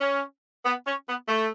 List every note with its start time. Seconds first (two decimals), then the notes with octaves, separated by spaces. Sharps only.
0.01 C#4
0.65 B3
0.86 C#4
1.07 B3
1.28 A3